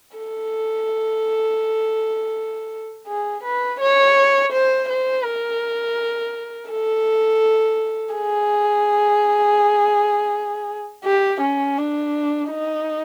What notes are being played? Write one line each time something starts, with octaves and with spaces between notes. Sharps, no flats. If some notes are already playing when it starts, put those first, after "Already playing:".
A4
G#4
B4
C#5
C5
C5
A#4
A4
G#4
G4
C#4
D4
D#4